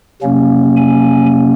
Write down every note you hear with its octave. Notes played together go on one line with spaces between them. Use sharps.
C3 F#3 A#3 C#4
G#5